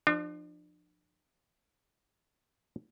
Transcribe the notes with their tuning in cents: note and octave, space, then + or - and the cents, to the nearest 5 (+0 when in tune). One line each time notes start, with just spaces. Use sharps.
F3 +0 D4 +40